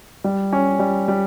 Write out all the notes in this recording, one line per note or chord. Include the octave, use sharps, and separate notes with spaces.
G3
C#4
G3
G3